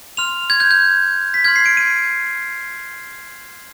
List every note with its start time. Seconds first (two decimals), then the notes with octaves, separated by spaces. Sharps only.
0.17 C6 F6 F7
0.50 G#6
0.60 G6
0.71 G6
1.34 B6
1.45 C6 F6 G#6
1.56 C7
1.66 D7
1.77 D#7